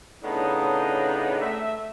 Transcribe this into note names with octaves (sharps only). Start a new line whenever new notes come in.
A2 C#3 B3 D4 D#4
A3 E5